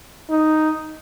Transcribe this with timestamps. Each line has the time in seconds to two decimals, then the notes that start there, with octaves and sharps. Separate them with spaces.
0.30 D#4